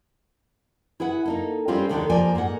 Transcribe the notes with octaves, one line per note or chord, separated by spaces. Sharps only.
E4 G#4 B4 F#5
A#3 D#4 A4
G3 G#3 C4 C#4 F4
D#2 G#2 D3 D#3 G#3 A4
F2 F3 A#3 A4 D5 G#5
G#2 A#3 G#4 F#5